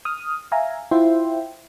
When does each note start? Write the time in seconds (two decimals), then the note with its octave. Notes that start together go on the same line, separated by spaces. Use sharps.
0.05 D#6 F6
0.52 E5 F5 G#5 A#5
0.91 E4 F4 C5 E5 G5 C6